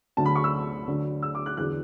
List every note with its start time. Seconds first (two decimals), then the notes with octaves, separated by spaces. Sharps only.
0.17 D2 D3 F#3 A5
0.26 B5
0.35 C#6
0.44 E6
0.87 D2 D3 F#3
1.23 E6
1.35 D6
1.46 F#6
1.57 E2 D3 F#3 F#6